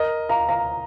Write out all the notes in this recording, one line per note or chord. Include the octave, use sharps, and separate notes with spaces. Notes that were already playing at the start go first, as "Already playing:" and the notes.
Already playing: A#4 D#5
F5 A#5
F5 A#5